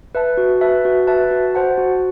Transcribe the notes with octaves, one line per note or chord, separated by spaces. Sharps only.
B4 E5 A5
F#4
B4 E5 A5
F#4
B4 E5 A5
F#4
C5 F#5 A5
F#4